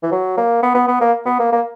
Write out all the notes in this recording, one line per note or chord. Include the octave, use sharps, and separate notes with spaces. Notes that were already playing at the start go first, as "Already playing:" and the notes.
E3
F#3
A#3
B3
B3
B3
A#3
B3
A#3
A#3